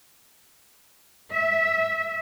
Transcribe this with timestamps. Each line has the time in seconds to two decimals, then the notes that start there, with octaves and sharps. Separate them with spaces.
1.31 E5